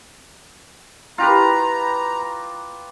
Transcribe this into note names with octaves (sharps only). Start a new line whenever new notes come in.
F4 G4 B4 A#5